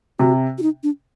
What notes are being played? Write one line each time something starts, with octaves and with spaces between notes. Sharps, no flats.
C3 F#4
F#4
D#4
D4